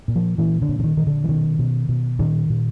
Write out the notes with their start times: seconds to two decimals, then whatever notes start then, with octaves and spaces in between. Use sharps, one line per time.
0.08 A#2
0.16 F3
0.38 A#2 E3
0.62 D3
0.69 A#2
0.80 D3
0.84 D#3
0.97 A#2 D#3
1.07 D3
1.24 E3
1.29 B2 D#3
1.59 B2
1.89 B2
2.19 A#2 D#3
2.50 A#2